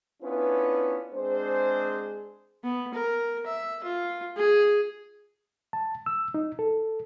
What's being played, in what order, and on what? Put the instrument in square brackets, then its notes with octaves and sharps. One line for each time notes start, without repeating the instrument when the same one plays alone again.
[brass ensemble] B3 C#4 D4 E4 F4 B4
G#3 C4 D4 G#4 C5
[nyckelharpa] B3
A#4
E5
F4
G#4
[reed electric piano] A5
E6
D#4
A4